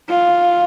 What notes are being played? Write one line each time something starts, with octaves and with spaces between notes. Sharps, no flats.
F4